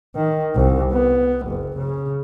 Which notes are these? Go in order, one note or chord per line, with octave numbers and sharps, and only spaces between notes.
D#3
C2
B3
F#1
C#3